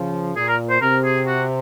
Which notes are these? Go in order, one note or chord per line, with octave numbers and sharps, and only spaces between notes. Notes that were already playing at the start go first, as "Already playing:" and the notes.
Already playing: C#3 F3
A#2 G#4
A#4
C5
C3 A#4
G#4
F#4